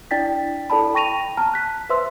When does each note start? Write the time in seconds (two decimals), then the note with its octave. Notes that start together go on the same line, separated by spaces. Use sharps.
0.11 D4 E4 D5 G5 A6 B6
0.70 E4 A4 D5 A5 B5
0.94 G5 C#6 A#6 D#7 F7
1.37 A5 A#5 F6
1.54 F#6 B6
1.89 B4 C5 E5 C6 E6